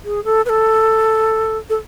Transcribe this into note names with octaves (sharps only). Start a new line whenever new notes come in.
G#4
A4
B4
A4
A4